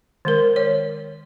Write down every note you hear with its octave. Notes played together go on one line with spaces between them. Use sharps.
D#3 G#3 A#4
C#5